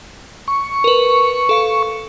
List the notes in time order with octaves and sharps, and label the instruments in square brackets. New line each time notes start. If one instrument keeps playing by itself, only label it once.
[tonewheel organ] C#6
[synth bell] A#4 B4
A4 F5 C#7